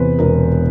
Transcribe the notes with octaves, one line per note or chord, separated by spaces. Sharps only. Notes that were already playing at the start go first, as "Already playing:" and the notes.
Already playing: E2 C3 B4 C5
E1 A#4